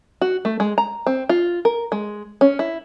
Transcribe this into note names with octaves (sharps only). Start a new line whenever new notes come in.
F#4
A3
G#3
A#5
C4
F4
A#4
G#3
C#4
E4